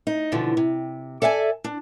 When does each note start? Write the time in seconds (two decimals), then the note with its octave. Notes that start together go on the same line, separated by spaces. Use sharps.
0.07 D#4
0.32 D#2 B2 D3 E3 F3
0.57 C3
1.22 A4 D5 E5 F#5 G#5
1.64 D4